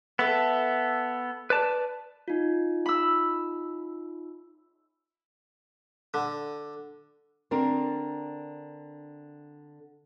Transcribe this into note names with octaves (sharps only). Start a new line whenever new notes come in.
B3 A4 E5
B4 D5 A5
D#4 F4
B5 E6
D3
D3 C4 D4 A#4